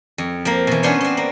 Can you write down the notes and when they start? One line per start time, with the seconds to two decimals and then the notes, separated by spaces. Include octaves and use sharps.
0.18 F2
0.45 F3 A#3
0.67 B2 E3
0.83 B3 C#4 D4 C5 C#5
1.01 B3 C4
1.17 A#3